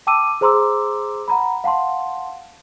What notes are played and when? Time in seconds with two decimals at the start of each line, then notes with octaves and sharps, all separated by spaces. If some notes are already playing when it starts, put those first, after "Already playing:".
0.07 G5 A5 D6 E6 D#7
0.41 G#4 C5 A#5 C6 D6 E6
1.28 F#5 A#5 B5
1.64 F5 F#5 A5 C6